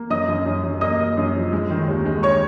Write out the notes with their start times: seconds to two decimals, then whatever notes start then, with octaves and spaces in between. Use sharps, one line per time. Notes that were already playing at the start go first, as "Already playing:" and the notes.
Already playing: A#3
0.10 F#2 D#5 D#6
0.28 F#2
0.46 F#2
0.64 F#2
0.81 A#3 D#5 D#6
1.00 A#3
1.18 F#2
1.35 F3
1.52 G#3
1.71 D#3
1.88 D#2
2.05 G#3
2.23 C#5 C#6